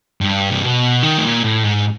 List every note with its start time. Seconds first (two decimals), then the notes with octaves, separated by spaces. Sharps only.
0.21 G2
0.50 C3
0.62 B2
1.03 D#3
1.18 A2
1.23 A#2
1.44 A2
1.64 G#2